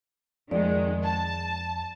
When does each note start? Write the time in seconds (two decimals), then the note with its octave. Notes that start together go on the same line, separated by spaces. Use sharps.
0.51 F2 D#3 G#3 D5
1.04 A5